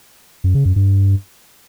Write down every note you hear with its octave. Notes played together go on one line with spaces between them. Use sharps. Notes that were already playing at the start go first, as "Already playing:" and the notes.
F#2
C#3
F#2
G2